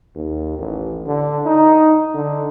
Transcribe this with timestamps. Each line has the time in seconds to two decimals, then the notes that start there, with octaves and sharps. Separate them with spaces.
0.16 D#2
0.59 A1
1.06 D3
1.46 D#4
2.14 D3